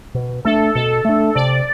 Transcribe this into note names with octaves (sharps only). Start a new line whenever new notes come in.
B2
A3 D4 A4
B2 A4
A3 D4
C3 D5